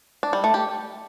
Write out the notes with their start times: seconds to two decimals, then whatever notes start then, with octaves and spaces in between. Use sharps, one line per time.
0.23 D4
0.33 G3
0.44 A3
0.54 G4